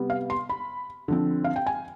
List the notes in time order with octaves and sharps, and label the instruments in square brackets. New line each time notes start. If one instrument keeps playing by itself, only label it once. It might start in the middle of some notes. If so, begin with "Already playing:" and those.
Already playing: [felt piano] C3 G3 B3
F5
C6
B5
D3 F3 C4
F5
G5
G#5